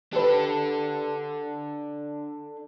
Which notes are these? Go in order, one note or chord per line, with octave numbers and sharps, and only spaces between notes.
D4 G4 A4 B4